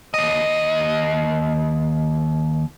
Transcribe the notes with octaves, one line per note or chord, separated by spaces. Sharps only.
D#2 D#5